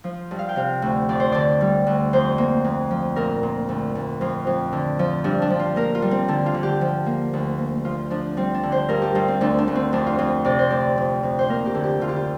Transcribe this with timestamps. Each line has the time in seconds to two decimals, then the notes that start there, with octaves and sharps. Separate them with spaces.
0.04 F3 F4
0.31 G2
0.39 F5
0.49 G5
0.56 C3 F5
0.82 D2
1.09 F2 D5
1.20 C5
1.32 D3 D5
1.61 G3
1.87 D2
2.13 F2 C5
2.38 A#3
2.64 F2
2.91 F3
3.16 A#2 A#4
3.43 A#2
3.69 D2
3.95 D2
4.21 F2 F4
4.47 F2
4.72 D3
4.99 F3
5.24 G2 D4
5.42 D4
5.50 F3
5.59 F4
5.76 A#3 A#4
5.95 F4
6.02 G3
6.11 C4
6.28 D3 D4
6.46 F4
6.54 D3
6.63 G4
6.81 F3
7.06 A#3
7.33 D2
7.59 A#3
7.85 F3 F4
8.10 F3 D4
8.37 G3 C4
8.54 D4
8.63 D3
8.72 C5
8.89 G2 A#4
9.02 G4
9.15 G2 F4
9.28 C4
9.41 D2 D4
9.58 D4
9.68 D2
9.75 C4
9.93 F2 D4
10.06 F4
10.18 F2 F4
10.45 C3 D5
10.59 C5
10.71 D2 D5
10.98 F2
11.23 F2
11.39 C5
11.49 A#3 A#4
11.66 G4
11.75 D3
11.84 G4
12.01 D3 F4
12.09 G4
12.16 F4